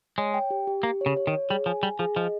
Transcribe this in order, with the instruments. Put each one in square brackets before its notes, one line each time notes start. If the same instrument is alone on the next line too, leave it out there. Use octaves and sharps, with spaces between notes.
[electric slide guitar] G#3 [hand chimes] C#5
[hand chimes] G5
G4
G4
[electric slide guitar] A#3 [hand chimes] G4
[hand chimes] C#5
[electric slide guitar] C#3
[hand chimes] C#5
[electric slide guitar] D#3
[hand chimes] C#5
[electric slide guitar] G3 [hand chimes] G#4
[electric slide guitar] F3 [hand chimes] G#5
[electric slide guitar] G3 [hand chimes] G#5
[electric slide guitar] F3 [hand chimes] G#4
[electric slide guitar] F3 [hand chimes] D#5